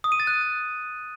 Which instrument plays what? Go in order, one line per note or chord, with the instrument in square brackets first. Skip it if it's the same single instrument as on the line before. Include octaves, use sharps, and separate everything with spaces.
[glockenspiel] D#6
D#7
A6
F#6